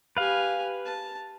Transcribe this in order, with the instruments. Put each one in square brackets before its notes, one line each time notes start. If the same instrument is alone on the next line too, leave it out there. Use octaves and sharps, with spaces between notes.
[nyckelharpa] G4 G#5 [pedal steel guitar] B4 F5
[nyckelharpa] A5